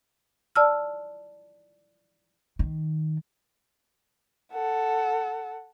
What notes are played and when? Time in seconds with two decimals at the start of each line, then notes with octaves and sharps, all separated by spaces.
0.56 D5 A5 E6 F6
2.59 D#3
4.52 A4 F#5